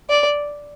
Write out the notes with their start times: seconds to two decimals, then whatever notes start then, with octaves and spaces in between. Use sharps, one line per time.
0.10 D5